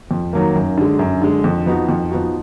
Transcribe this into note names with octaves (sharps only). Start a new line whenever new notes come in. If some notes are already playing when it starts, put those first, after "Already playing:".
F2
D#3 F#3 A#3
F#2
D3 G#3
F#2
D3 G#3
F2
F3 B3 D#4 F#4
F2
F3 B3 D#4 F#4